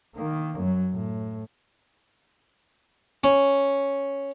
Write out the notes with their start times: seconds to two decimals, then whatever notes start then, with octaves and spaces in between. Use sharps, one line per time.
0.15 D#3 A#3
0.59 F#2 F#3
0.93 A2
3.24 C#4